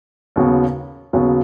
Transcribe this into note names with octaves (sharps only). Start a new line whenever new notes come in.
D#2 C#3 F#3 B3
D#2 C#3 F#3 B3